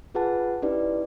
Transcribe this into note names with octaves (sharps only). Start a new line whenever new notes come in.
F4 G#4 B4 F#5 A5
C#4 D#4 E4 G4 B4 D5